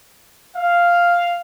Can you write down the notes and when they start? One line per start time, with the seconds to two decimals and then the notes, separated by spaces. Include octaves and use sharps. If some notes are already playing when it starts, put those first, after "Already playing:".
0.57 F5